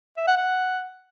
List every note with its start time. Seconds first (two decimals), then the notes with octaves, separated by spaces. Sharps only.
0.17 E5
0.27 F#5
0.37 F#5